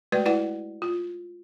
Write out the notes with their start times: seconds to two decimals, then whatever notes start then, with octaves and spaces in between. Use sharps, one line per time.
0.12 G#3 A3 F#4 B4 D5
0.25 E4 B4 D5 F#5
0.82 F4